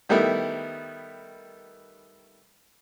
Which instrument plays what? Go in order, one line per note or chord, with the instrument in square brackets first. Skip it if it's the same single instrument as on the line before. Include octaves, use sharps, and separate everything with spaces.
[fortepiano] D#3 G3 A3 B3 E4